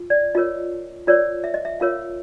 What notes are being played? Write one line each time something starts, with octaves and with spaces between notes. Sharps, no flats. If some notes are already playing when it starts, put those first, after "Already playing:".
Already playing: F4
D5
F4 A#4 C#5 D#5
F4 A#4 C#5 D5
E5
D#5
E5
F4 A#4 C#5 F5